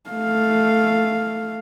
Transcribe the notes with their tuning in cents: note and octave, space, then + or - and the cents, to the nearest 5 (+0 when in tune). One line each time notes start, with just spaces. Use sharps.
A3 +0 F5 +0